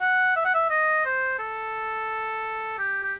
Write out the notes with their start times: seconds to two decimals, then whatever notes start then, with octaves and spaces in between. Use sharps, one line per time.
0.01 F#5
0.36 E5
0.45 F#5
0.54 E5
0.70 D#5
1.05 C5
1.39 A4
2.79 G4
3.03 G4